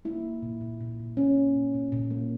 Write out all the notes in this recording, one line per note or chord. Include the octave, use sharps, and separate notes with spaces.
A#3 E4
A#3
A#2
A#2
A#2
A#2
A#2 C#4
A#3
A#2
A#2
A#2
A#3